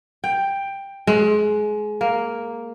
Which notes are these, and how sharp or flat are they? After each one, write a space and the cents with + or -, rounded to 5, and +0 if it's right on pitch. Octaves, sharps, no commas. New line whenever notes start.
G5 +10
G#3 +25
A#3 +0